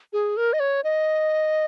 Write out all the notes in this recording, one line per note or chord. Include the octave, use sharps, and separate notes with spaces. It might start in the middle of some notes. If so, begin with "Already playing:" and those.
G#4
A#4
D#5
C#5
D#5